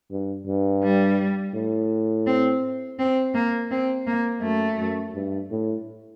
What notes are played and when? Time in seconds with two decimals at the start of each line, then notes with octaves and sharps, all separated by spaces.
0.11 G2
0.46 G2
0.83 G3
1.54 A2
2.27 C4
2.99 C4
3.34 A#3
3.71 C4
4.07 A#3
4.42 F#2 A3
4.78 F#2
5.14 G2
5.51 A2